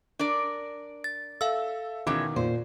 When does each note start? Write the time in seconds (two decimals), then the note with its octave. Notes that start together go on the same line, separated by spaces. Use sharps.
0.19 D4 A#4 D5
1.04 A6
1.41 A4 E5 F5 E6
2.07 B2 D#3 E3 G#3 C#4 D6
2.36 A#2 C5